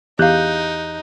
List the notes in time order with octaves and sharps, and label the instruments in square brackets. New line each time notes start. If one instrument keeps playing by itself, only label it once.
[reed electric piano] E2 F#6 G6 [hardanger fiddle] D#4 [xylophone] G4 F5